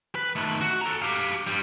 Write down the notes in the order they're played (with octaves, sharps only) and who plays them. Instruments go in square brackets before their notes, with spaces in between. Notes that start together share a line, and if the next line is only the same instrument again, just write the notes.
[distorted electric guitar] B4
D#3 A3
F#4
A4 A#5
G4 F5
G2 G3